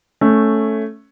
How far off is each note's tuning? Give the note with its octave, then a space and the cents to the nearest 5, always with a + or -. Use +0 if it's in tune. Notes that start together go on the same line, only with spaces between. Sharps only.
A3 +0 C#4 +0